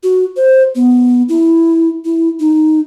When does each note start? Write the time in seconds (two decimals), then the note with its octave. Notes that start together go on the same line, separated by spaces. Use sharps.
0.03 F#4
0.37 C5
0.75 B3
1.29 E4
2.05 E4
2.40 D#4